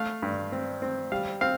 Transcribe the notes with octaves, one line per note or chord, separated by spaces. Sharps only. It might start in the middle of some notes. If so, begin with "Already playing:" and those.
Already playing: A3 F5
G2
C4
C4
G3 F5
C4 F5